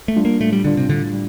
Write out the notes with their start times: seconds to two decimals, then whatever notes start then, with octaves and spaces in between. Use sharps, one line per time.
0.08 A3
0.16 G3 D4 F4
0.25 A#3
0.40 A2 A3
0.52 G3
0.64 D3 G3 D4 F4
0.77 C3
0.88 A2 D3
1.13 G3